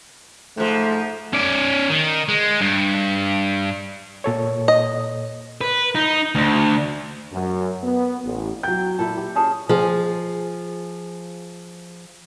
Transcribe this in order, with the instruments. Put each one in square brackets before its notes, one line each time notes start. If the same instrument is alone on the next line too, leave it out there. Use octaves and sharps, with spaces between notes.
[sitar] G#2 F3 [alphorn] A3
[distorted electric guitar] C#4 D5
D#3
G#3
G2
[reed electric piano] A#2 A4 C#5
[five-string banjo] D#5
[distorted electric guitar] B4
D#4
D2
[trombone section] F#2
B3
A1
[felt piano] F#3 G6 [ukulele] G5
[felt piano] A#2 [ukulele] E4 A4
[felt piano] G4
[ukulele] C#4 G#4 A5
[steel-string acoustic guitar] F3 G#4